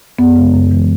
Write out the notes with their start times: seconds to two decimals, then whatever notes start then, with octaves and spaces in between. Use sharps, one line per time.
0.19 F#2 B3
0.36 C#3 G#3
0.54 F#2
0.71 E3 G#3